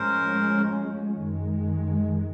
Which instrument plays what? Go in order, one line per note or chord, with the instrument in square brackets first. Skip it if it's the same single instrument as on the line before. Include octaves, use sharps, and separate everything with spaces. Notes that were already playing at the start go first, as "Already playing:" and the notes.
Already playing: [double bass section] A2 F3 G#3 C#4 [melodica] A#4 C5
[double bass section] F#2 D#3 G#3